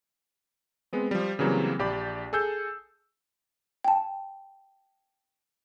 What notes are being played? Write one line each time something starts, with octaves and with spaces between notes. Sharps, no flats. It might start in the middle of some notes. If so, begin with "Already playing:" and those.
G#3 B3 C4
F3 G3
C#3 E3 F#3 G3 A#3 C4
A#1 G4 D5 B5
G#4 A4 E6 G6
G5 A5